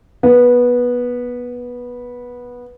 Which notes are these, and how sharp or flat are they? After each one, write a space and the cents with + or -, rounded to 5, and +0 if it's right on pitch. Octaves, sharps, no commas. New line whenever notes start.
B3 -15